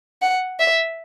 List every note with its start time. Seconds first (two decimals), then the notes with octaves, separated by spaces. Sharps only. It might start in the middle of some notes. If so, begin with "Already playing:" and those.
0.22 F#5
0.60 E5